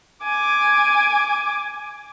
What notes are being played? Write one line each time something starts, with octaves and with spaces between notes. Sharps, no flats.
G#5 D6